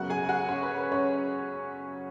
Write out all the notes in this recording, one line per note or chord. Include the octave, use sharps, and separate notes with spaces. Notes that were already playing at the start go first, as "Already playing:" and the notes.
Already playing: F#2 C#3 F#3 B3 F#4 F#5
G#4 G#5
F#4 F#5
C#4 C#5
B4
B4
C#4 C#5